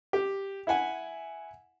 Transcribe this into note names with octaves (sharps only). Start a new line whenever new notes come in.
G4
E4 E5 F#5 G#5